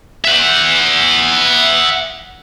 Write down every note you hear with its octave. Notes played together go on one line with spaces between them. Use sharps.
E5 F#5